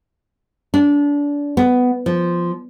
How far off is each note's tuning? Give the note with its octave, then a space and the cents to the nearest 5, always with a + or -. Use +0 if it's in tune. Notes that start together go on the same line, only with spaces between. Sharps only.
D4 -25
B3 +10
F3 -5